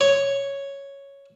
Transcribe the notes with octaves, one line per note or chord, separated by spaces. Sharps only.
C#5